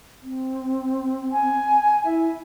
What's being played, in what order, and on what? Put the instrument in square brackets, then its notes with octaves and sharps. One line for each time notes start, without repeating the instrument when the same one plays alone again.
[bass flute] C4
[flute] G#5
[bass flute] E4 [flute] E5